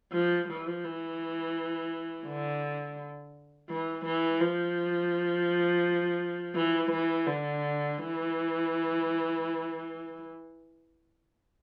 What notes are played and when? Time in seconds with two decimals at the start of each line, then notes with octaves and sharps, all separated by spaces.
0.12 F3
0.48 F3
0.84 E3
2.27 D3
3.70 E3
4.06 E3
4.41 F3
6.55 E3
6.91 E3
7.27 D3
7.98 E3